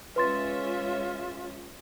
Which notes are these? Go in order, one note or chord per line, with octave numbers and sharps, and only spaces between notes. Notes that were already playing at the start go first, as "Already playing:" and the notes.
G#3 C#4 F4 B4 E5 C6 A6